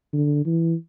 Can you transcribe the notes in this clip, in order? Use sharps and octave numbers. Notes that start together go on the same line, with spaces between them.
D3
E3